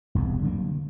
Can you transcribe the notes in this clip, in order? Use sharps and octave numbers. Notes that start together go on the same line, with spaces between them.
E1 C2 G#2
D3 F#3 A#3